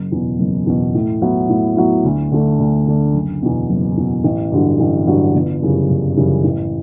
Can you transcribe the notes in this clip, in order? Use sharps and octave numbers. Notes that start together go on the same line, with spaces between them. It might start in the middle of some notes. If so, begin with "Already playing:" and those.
Already playing: F#1
E2 B2
F#1
E2 B2
A2
F#3 B3 E4
A2
F#3 B3 E4
D2
D3 A3 D4
D2
D3 A3 D4
F#1
E2 B2
F#1
E2 B2
A1
G2 D3 F#3
A1
G2 D3 F#3
G1
F#2 C#3 E3 G3
G1
F#2 C#3 E3 G3
A1